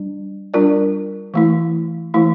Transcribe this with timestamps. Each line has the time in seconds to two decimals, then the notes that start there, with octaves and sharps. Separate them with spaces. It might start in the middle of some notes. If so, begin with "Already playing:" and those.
Already playing: G3 D4
0.54 G3 D4 F4 A#4 D5
1.34 E3 A3 E4
2.14 E3 A3 E4